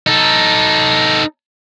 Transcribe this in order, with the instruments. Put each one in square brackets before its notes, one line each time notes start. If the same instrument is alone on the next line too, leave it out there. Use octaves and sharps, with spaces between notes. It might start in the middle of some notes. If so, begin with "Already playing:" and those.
[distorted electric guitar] D#4 A4